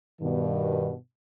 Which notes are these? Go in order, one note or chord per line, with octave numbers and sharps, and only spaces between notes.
G2 B2 D#3